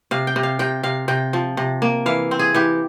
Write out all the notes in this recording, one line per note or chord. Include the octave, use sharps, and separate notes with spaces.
C3 F5
G5
C3
F5
C3 G5
C3 F5
C3 G5
F3
C3
A#3
E3 F5
C4
G#4
E3 G4